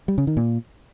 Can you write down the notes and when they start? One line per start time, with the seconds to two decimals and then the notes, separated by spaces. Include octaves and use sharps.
0.08 G3
0.18 C#3
0.27 D#3
0.37 A#2